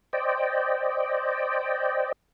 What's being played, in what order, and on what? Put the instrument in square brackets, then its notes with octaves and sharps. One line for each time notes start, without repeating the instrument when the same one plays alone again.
[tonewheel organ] C5 D5 D#5 G5